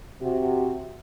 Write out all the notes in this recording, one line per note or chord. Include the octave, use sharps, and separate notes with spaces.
C3 F#4